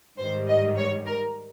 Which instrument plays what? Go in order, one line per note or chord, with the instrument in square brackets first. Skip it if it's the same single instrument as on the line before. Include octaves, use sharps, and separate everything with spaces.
[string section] G#2 D#3 G3 C5
D#5
C#5
A#4